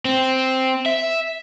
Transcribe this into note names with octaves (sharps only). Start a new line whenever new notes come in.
C4
E5